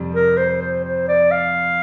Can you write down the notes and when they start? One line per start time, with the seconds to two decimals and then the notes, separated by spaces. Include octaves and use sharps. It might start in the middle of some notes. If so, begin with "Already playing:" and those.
Already playing: F2 C3 G3
0.15 A#4
0.37 C5
0.61 C5
0.84 C5
1.08 D5
1.31 F5